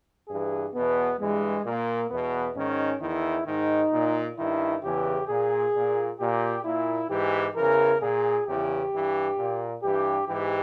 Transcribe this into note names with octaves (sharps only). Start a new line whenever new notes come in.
G2 E3 G#4
E2 B2 B3
G2 E3 G#3
A#2 A#3
E2 B2 B3
G#2 D#3 C#4
E2 D#3 E4
G#2 D#3 D#4
A#2
G2 D#3 E4
E2 C#3 E3 G4
A#2 G#4
A#2
A#2 G4
A#2 E4
G#2 E3 G4
E2 C#3 E3 A#4
A#2 G#4
E2 C#3 E3 G4
G2 E3
A#2
G2 E3 G4
G#2 E3 G4